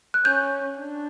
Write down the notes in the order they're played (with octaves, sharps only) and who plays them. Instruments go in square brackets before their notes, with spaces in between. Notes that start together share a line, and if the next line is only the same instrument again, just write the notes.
[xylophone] F#6
[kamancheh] C#4 [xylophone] G6
[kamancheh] D4